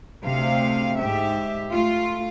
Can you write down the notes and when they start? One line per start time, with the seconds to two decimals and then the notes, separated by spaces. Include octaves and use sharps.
0.25 D2 C3 F5
1.00 G#2 G4 E5
1.70 A3 F4